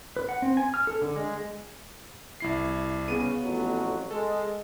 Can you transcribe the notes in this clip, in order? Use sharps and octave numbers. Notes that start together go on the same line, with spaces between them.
B4
F#5
C4
G#5
F6
A4
D3
G#3
C2 E4 C7
C#3 B3 D#7
A1 F2 F#3
G#3 A4